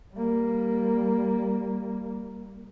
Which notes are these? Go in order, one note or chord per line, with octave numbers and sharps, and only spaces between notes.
G3 A#3